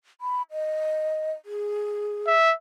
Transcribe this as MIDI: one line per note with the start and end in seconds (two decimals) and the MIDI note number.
0.21 0.42 83
0.52 1.31 75
1.45 2.28 68
2.27 2.53 76